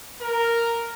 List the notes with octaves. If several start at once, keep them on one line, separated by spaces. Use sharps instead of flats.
A#4